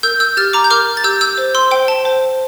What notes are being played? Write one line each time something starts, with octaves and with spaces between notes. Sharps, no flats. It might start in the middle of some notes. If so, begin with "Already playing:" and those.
A#4 E6 G6
E6 G6
G4 F6 A6
A#5 D6
G6
A#4 D6 F6
A6
G4 E6 G6
E6 G6
C5
C6 E6
C5 G5
A5
C5